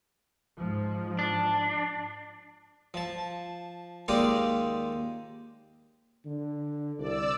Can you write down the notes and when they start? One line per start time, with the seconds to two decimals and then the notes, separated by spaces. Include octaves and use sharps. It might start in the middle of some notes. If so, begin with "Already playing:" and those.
0.57 G#2 F3
1.19 D4
2.94 F3 A5
4.08 D#2 G#3 F4 G4 D5 D#6
6.26 D3
6.99 C2 D5 E6